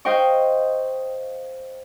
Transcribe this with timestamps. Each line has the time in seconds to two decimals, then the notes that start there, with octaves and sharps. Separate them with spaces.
0.05 C5 D#5 F5 G5 C#6